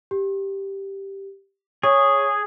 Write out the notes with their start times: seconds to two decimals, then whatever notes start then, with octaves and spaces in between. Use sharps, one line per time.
0.11 G4
1.83 G#4 C#5 C#6